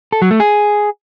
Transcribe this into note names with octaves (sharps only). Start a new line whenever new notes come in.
A4
F#3
A3
G#4